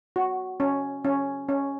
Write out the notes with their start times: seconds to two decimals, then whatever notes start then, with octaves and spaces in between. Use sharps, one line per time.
0.16 F#4
0.60 C#4
1.04 C#4
1.49 C#4